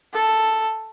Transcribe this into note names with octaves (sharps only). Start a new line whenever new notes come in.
A4